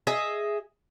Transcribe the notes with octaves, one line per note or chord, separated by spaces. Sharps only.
G#4 D#5 E5